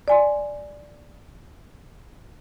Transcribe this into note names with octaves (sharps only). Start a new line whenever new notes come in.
D5 G#5 C6